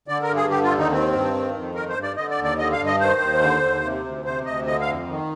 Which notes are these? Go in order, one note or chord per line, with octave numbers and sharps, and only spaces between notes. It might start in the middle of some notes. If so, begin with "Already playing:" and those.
D3 D5
A#4
G2
G#4
D3 G4
F4
D#2
D#4
D#3 C4
G2
D#3
F2
D#3 A#4
C5
G2
D5
D3 D#5
D5
D#2
D5
D3 D#5
F5
G2
D#5
D#3 C5
D#2
D3
D#2
C3
D2
C3 C5
D2 D#5
D3 D#5
F5
F2
D#3